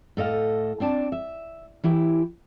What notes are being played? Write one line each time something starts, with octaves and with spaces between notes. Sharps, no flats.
A2 A4 D#5 F5
C4 D4 D5 A5
E5
E3 E4 G4